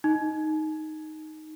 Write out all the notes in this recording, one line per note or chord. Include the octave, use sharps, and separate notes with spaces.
D#4